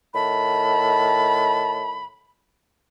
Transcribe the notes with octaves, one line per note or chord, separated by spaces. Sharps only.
A2 D#3 A5 B5